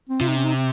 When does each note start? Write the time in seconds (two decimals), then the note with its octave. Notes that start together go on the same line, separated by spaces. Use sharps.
0.09 C4
0.21 C3 F4
0.28 D#4
0.36 C#4
0.44 D#4
0.54 C4